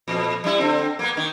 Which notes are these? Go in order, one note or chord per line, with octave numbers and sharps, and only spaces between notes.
F2 A#2
G3 E4
D3 C4
A#3 B3
D#3